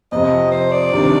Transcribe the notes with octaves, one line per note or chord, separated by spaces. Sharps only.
F2 C3 F3 D#5
C5
D5
C3 D#3 G3 D4